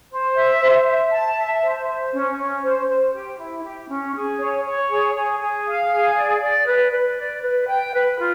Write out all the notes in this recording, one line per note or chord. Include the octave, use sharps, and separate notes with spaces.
C5
E5
C5
E5
A5
E5
C5
C5
C#4
C#4
C5
C5
G4
E4
G4
C#4
G#4
C#5
C#5
G#4
G#4
G#4
F5
G#4
D5
D5
B4
B4
D5
B4
G5
B4
F4